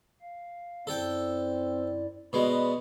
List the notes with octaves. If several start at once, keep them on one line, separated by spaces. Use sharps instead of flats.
F5
F#2 C4 E4 A4 D5 G5
B2 G#3 B4 D5 B5